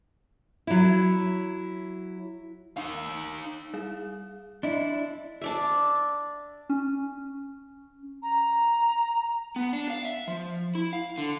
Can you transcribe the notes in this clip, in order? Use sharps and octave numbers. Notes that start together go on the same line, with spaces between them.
F#3 E4
D#4 F5
G3 G#4
D4 E4 D5 D#5
D4 D5 E5
C#4
A#5
B3
D4
F5
E5
F3
E4
F5
D3